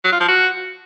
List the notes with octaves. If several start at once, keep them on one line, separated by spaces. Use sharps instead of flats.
F#3
F4
F3
F#4